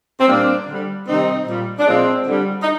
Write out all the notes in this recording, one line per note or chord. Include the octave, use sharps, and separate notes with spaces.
C4
A#2 G3 A#3 D4
D3 G3
C3 D#3 G3 C4 D#4
A#2 G3
D4
A#2 F3 G#3 C4
D3 G3
D#4